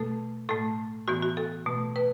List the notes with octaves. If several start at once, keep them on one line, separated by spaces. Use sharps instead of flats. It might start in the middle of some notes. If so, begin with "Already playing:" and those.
Already playing: B2 A3 A4
A2 A3 A4
A2 E3 B3 F#4
F#4
A4
B2 A3
B4